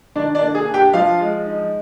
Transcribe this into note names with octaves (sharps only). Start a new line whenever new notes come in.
D#3 D4 D5
D4 D5
A#3
G#4
D4
G4 G5
F3 F4 F5
G#3
D#4